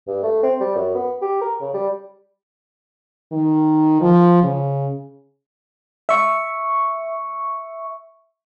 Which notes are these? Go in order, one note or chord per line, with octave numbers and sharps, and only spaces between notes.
G2
A3
C4
G3
F#2
B3
G4
A#4
C#3
G3
D#3
F3
C#3
E5 C#6